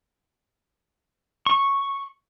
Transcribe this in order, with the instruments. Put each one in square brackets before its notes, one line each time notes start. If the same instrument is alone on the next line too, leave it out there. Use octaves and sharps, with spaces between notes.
[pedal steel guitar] C#6